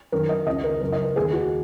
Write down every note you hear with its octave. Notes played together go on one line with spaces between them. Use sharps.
F#2 D#3 A#4
D#5
C#2 C#3 D#5
A#4
F#2 C#3 A#4
D#5
A#4
D#2 D#3 G#4
F#4